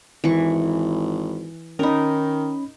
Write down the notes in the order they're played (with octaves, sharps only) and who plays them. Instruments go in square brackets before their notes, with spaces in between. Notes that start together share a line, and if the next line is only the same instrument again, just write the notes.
[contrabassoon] G#1 [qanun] E3 C#6
[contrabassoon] D#3 [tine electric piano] C#4 B5 [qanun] D#4 A#4